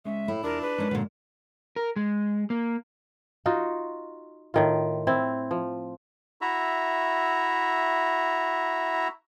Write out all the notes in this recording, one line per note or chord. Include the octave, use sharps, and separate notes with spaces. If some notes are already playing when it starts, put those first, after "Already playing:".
G#3 C#4 E5
A2 E4
E2 D4 F4 G4 A#4
F4 G#4 B4
G#3 C#4 D#4 A#4
A#2 D3 F#3
A#4
G#3
A#3
D#4 F4 F#4
A2 D#3 F4
C4 E4
F3
E4 F#4 E5 A#5